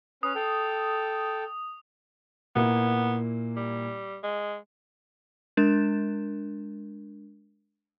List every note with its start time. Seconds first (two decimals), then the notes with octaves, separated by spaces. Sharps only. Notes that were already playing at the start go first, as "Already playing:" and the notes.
0.23 C#4 B4 D#6
0.35 A4 G5
2.56 A#2 A#3 B3 E4
3.57 G3
4.23 G#3
5.57 G#3 D4 A#4 G6 A6 E7